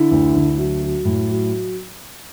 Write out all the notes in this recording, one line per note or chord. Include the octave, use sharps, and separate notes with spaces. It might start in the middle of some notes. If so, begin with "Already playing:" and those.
Already playing: D3 E4
D2
D2
F#3
F#3
A2
F#3